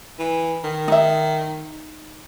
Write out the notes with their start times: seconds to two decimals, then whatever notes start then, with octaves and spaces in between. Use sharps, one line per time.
0.19 E3
0.64 D#3
0.88 D#4 E5